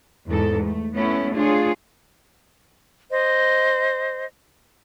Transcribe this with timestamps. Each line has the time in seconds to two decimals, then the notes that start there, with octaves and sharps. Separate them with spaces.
0.27 E2 G#2 A4
0.64 A3
0.95 A3 B3 C#4 E4
1.34 D4 F4 G#4 C#5
3.11 C5 D#5